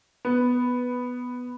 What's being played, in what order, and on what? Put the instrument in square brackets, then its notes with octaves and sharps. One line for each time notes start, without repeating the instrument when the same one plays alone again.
[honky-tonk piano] B3